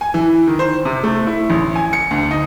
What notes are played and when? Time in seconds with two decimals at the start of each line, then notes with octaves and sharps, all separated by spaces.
0.01 G#5
0.14 E3
0.47 D#3
0.59 C5
0.85 C3
1.04 A3
1.27 E4
1.50 A1
1.75 G#5
1.93 C#7
2.11 D2
2.31 D#4